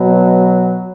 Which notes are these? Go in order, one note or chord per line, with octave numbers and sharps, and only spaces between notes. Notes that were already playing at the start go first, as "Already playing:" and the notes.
Already playing: B2 F#3